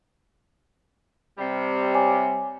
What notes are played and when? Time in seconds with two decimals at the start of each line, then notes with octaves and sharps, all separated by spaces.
1.38 C3 G3
1.94 C#5 G#5 D6